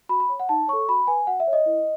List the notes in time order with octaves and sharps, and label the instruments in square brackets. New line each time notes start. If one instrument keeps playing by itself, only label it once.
[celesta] F#4 B5
B5
C#5
F#5
D#4 A5
A4 C#5 C#6
F#4 B5
B4 G#5
F#4 F#5
E5
C#5
D#5
E4